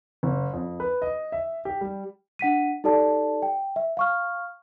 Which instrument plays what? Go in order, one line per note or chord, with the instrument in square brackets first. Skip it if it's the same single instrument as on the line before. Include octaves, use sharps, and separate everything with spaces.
[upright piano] F#1
F2
B4
D#5
E5
G4
G3
[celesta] D4 F#5 B6 D#7
D#4 G4 A4 D5 A5
G5
E5
F5 C#6 F6